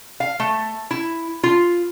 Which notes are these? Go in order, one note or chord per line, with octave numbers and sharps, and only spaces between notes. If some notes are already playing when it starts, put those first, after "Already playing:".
F5
A3
E4
F4